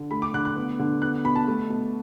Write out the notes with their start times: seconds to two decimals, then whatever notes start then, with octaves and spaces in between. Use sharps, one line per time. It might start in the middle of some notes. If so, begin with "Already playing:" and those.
Already playing: D3
0.11 A3 B5
0.22 D6
0.34 D3 F#6
0.45 F#6
0.56 B3
0.79 D3
1.02 B3 F#6
1.24 B2 B5
1.35 A5
1.47 A3
1.70 B2